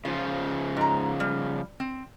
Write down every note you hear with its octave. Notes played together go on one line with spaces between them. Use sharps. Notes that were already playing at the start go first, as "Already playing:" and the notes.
C#3 F3 F4
G#2 A#5
G3
C4